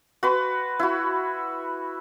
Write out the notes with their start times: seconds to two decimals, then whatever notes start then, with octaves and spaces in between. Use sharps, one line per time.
0.23 F#4 B4 C6
0.79 E4 F#4